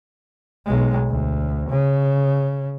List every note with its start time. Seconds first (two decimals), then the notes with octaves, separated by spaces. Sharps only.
0.66 B1 G#3
1.09 D2
1.69 C#3